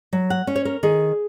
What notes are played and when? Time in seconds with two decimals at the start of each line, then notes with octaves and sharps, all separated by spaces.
0.13 F#3
0.30 F#5
0.47 C#4
0.56 C#5
0.65 A#4
0.83 D#3 G#4